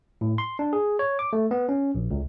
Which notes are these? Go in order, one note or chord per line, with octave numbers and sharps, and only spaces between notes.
A2
C6
D4
G#4
C#5
D6
A3
B3
C#4
A#1
C#2